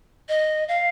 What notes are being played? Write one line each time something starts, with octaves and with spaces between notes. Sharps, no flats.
D#5
F5